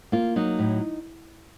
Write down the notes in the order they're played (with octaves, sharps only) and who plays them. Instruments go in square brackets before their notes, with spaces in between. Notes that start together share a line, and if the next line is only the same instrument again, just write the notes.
[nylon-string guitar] A#3 F4
F#3 D#4
A2